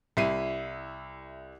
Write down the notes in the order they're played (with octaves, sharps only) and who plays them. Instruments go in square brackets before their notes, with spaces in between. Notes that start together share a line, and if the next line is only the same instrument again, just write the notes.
[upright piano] C2 E4 C7 D#7